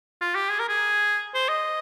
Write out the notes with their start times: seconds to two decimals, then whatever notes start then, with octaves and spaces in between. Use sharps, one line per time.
0.21 F4
0.35 G4
0.50 G#4
0.59 A#4
0.69 G#4
1.34 C5
1.49 D#5